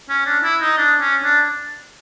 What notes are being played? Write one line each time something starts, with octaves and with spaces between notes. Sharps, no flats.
C#4
D4
E4
D#4
D4
C#4
D4